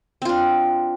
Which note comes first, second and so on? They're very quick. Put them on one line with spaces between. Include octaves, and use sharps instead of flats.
C4 F4 D4